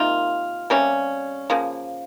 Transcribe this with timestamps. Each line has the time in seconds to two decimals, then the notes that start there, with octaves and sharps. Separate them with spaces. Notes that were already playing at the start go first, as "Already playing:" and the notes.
Already playing: C3 D#3 A#3 F4
0.70 C3 G3 A#3 C#4
1.50 C#3 F3 A#3